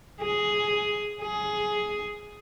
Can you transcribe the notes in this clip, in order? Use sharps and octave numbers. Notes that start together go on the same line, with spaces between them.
G#4
G#4